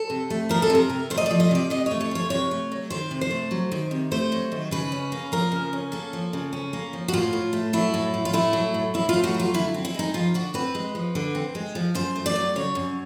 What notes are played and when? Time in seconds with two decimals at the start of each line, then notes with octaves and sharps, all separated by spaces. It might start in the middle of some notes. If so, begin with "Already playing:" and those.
Already playing: A4
0.10 C3
0.30 A3
0.49 F3 A#4
0.62 A4
0.70 C3 A#4
0.90 C3
1.10 A3 C5
1.17 D#5
1.26 F3 D5
1.40 D#5
1.51 C3 D5
1.70 C3 D#5
1.86 A3 C#5
2.01 C#5
2.11 F3 C#5
2.30 C3 C#5
2.51 A3
2.72 F#3
2.90 D#3 C5
3.11 C3
3.21 C5
3.31 A3
3.51 F#3
3.72 D#3
3.91 C3
4.11 A3 C5
4.32 F#3
4.52 D#3
4.71 C#3 B4
4.92 C#4
5.12 A#3
5.32 F3 A#4
5.52 C#3
5.73 C#4
5.92 A#3 A4
6.13 F3
6.33 C#3
6.53 C#4
6.73 A#3
6.93 F3
7.08 F#4
7.13 A2 F4
7.33 A2
7.53 A3
7.73 F#3 E4
7.94 A2
8.14 A2
8.25 F4
8.33 A3 E4
8.53 F#3
8.74 A2
8.94 A2 E4
9.09 F4
9.14 A3
9.24 F#4
9.34 F#3
9.40 F4
9.54 D3 E4
9.74 C4
9.85 E4
9.94 G#3 D#4
10.14 F3 F4
10.34 D3 F#4
10.54 C4 B4
10.75 G#3
10.95 F3
11.15 D3
11.35 C4
11.55 G#3
11.75 F3
11.95 F#2 C5
12.16 A3
12.26 D5
12.36 F#3
12.56 C#3 C#5
12.75 F#2